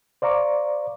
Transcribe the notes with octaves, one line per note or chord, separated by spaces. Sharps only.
C5 D5 F5 A#5 C#6 D6